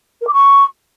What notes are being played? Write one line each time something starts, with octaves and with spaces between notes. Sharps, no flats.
A#4
D6
C#6